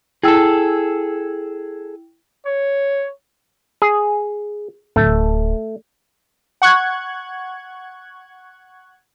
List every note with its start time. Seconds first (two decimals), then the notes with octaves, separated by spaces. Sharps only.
0.23 E4 G#4 A4 G5 E6
2.46 C#5
3.82 G#4
4.96 D1 A3
6.62 F#5 C#6 F#6 G#6